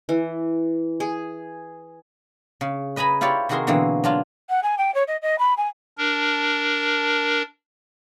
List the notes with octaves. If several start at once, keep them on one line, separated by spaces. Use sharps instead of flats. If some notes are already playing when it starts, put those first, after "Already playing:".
E3
G#4
C#3
B4 D#5 G#5 A#5 B5
E4 F4 G4 C#5 D5
C3 D#3 F#4 G#4 A#4 C6
B2 D3 E3 A#3 C4
F#3 D4 F4
F#5
G#5
G5
C#5
D#5
D#5
B5
G#5
D4 A#4